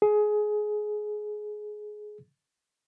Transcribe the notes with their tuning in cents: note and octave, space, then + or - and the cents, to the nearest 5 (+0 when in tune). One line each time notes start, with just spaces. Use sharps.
G#4 +20